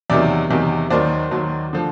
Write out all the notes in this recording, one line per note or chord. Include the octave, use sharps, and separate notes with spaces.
E2 C3 D#3 F#3 D5 E5
E2 C3 D#3 F#3
D#2 D#3 F#3 C5 D5
D#2 D#3 F#3
D3 F3